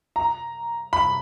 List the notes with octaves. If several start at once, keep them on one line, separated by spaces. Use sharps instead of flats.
A#5
B5